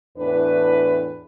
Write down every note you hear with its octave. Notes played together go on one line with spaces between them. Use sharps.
E2 A2 D4 B4